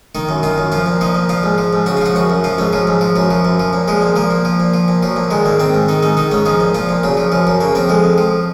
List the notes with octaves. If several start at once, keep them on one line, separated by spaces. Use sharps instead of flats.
D#3 D#4
F#2
D#3 F4
F#2
F3 F4
A#2
F3 D#4
A#2
F3 F4
G#2
F3
G#2
C#3 F#4
F4
F3 F#4
F#2 F#4
F#2
F3 F4
G#2 C#4
F3 F#3
G#2
F3
F#2 F#3
F3
F#2
F3
A#2
F3 G#3
A#2
F3 A#3
A#2
F3
A#2
F3
A#2
F3 F#3
A#2
D#3 G#3
G#2 A#3
D#3 C4
G#2
D#3 D#4
G#2 D#4
D#3 D#4
G#2 C#4
F3 D#4
A#2
F3 F4
A#2
C#3 F#3
F3
F#2 F3
F#2 F#3
C#3 A#3
F3 C4
F2 G#3
F2
F3